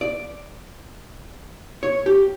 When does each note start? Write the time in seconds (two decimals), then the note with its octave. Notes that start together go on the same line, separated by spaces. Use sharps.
0.01 D5
1.83 C#5
2.06 G4